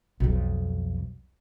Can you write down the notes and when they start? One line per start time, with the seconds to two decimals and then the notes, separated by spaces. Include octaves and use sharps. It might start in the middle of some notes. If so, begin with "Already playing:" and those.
0.20 B1 F2